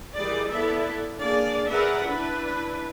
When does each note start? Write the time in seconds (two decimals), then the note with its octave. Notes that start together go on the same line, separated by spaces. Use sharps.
0.16 D#3 E3 G3 G#4 D5
0.50 B3 E4 A4 D5 E5
1.20 A#3 D4 G#4 D5 F5
1.67 G#4 A#4 B4 D5 E5 F#5
2.05 D4 E4 B4